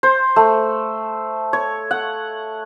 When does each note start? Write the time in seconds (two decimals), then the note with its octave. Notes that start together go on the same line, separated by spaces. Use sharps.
0.03 C5
0.36 A3
1.53 C#5
1.91 F#5